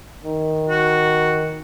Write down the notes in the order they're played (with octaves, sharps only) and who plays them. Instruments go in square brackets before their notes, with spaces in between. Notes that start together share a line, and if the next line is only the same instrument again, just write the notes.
[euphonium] D#3
[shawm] F#4